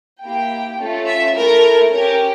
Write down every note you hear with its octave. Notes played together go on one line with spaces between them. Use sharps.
A#3 E4 G4 G5
A3 C#4 F4 A4
E5
A3 E4 A4 A#4
C#4 G4 A#4